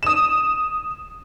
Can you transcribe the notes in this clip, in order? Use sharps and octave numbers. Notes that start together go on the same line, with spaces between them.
D#6 E7